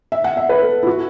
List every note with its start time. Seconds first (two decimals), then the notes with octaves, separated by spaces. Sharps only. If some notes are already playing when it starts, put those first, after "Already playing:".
0.12 E5
0.24 F#5
0.37 E5
0.49 B4
0.62 A4
0.83 E4
0.87 F#4